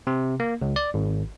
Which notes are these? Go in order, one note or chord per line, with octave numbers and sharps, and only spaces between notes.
C3
A#3
C#2
D5
G#1